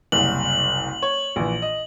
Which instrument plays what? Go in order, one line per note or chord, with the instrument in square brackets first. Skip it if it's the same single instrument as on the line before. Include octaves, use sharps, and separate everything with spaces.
[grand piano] F#1 C2 [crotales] F#7
[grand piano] C#5
A#1 E3
D#5